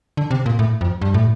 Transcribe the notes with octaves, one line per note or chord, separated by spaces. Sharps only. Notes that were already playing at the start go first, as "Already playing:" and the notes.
D3
C3
A#2
A2
F2
G2
A2